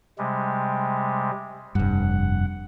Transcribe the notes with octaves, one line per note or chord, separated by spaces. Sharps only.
C3 G3 G#3
F1 G2 F#5